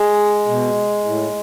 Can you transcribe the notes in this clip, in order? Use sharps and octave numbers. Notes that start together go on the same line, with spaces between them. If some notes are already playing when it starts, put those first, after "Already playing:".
Already playing: G#3
B2
A2